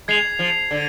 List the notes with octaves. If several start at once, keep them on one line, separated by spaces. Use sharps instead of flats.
G#3 G#6 C7 F7
F3
D3